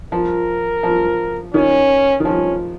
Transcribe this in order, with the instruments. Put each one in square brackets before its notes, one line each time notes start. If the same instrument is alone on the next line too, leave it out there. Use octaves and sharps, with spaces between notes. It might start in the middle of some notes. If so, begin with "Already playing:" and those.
[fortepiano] F3 [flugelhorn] A#4
[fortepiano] F3
[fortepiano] D#3 [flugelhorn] C#4
[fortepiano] D#3
[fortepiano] F3 [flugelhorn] C#4